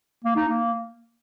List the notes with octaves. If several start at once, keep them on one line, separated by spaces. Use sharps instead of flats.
A#3
D#4
A#3